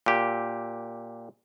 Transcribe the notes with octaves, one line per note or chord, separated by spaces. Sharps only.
A#2 G4